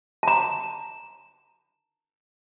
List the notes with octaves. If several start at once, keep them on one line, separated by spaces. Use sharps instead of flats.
A5 A#5